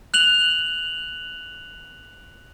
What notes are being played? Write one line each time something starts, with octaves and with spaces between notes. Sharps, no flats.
F#6 F7 F#7